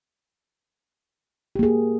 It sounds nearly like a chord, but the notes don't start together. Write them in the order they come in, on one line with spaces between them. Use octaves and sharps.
G4 A#3 G#4